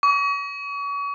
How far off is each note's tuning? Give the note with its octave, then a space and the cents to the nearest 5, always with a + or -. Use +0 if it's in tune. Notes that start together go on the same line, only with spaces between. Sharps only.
C#6 +40